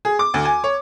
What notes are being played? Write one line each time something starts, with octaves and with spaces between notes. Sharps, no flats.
G#4
D6
D2
G#5
C#5